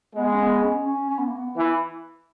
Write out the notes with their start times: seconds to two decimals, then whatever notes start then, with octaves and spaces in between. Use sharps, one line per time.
0.15 G#3 B3
0.33 C#4
0.39 B3
0.63 C#4
0.86 C#4
1.09 C#4
1.18 B3
1.28 A#3
1.36 B3
1.57 E3